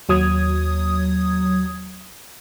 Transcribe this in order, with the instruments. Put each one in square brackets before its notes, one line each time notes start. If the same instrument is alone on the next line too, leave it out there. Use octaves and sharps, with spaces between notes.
[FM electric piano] D#2 F#3 D#6 G#6